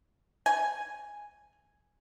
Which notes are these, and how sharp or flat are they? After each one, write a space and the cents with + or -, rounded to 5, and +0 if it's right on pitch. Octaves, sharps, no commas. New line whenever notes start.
G#5 -5